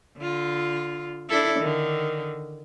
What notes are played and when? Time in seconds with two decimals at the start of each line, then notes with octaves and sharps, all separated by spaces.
0.17 D3 F4
1.29 D4 E4 A4
1.59 D3 D#3